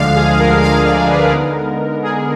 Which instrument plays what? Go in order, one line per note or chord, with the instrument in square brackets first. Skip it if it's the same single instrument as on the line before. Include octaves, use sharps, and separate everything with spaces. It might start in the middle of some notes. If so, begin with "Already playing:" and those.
Already playing: [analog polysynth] D2 D3 F3 G#3 D4 F5
G#4
A#4
F5
D5
B4
D3 G#3 B3 D#4 A#4
G#4